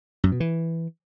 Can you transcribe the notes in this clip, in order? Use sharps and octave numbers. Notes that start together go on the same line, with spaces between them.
F#2
B2
E3